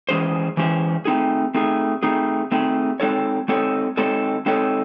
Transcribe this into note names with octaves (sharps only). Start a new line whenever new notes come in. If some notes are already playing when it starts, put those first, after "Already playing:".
E3 G#3 C#4 G#4 C5
E3 G#3 C#4 G#4 C5
A3 C4 D#4 G#4
A3 C4 D#4 G#4
A3 C4 D#4 G#4
A3 C4 D#4 G#4
G#3 C4 D#4 A4 C#5
G#3 C4 D#4 A4 C#5
G#3 C4 D#4 A4 C#5
G#3 C4 D#4 A4 C#5